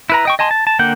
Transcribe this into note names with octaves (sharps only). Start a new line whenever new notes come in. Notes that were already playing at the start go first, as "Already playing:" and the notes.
E4 B4 A#5
D#5 G5 C#6
D#5 G#5 A5 C6
A5
A5
D3 A#3 F#5 G5 G6